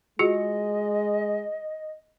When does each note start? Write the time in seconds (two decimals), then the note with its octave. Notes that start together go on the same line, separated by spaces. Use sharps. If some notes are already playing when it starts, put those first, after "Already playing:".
0.19 G#3 F4 F#4 G#4 D#5